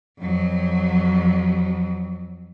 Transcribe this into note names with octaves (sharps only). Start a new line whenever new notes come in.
F2 F#3